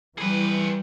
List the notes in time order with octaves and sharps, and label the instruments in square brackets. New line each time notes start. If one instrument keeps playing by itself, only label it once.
[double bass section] E3 [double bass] G3 [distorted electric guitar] G#4 B4